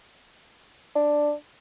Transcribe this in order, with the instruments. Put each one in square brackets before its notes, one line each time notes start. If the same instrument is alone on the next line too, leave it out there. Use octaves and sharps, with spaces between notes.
[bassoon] D4